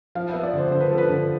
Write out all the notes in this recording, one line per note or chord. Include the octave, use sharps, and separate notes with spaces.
F3 F5
E5
B3
D5
D3 C5
D3 C5
B4
F3 A4
B4
D3